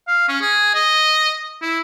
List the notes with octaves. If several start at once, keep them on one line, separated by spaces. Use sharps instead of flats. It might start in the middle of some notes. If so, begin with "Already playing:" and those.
F5
C#4
G#4
D#5
E4